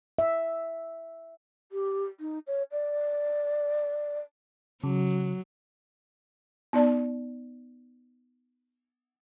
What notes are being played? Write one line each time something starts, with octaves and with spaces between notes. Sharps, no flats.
E5
G4
D#4
C#5
D5
C#3 F#3
B3 D#4 D5 A5